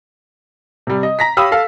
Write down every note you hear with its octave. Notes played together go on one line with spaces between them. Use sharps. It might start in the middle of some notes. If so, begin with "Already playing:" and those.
C3 G3
D#5
A#5 A#6 B6
G4 C#5 F5 B5 D#6 E6
A4 F5